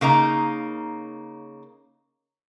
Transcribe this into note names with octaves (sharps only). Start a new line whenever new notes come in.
C#3 A#3 D#4 A#5